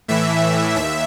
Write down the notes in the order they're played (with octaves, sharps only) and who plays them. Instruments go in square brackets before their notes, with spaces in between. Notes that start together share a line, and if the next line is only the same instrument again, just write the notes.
[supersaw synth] A2 E3 E5
D#2 E5